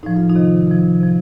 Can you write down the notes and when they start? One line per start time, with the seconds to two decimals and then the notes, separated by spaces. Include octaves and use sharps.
0.03 A2 F3 D#4
0.16 F4
0.30 D#4
0.35 C3 D#3
0.67 C3 F3
1.01 C3 F3